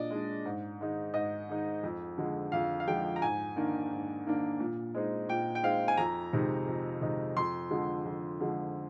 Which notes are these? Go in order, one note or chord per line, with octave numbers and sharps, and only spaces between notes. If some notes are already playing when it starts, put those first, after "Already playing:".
Already playing: A#2 D4 D5 D#5
G#3 D4
G#2
D#3 G#3 D#4
G#2 D#5
D#3 G#3 D#4
F2
D3 F3 G#3
F2 F5
F5
D3 F3 G#3 G5
A#5
G#2 G#5
D#3 A#3 D4
G#2
D#3 A#3 D4
A#2
G#3 C4 D#4
A#2 G5
G5
G#3 C4 D#4 F5
G#5
F2 A#5
C3 D#3 G#3 D#4
F2
C3 D#3 G#3 D#4
F2 C6
D3 F3 G#3
F2
D3 F3 G#3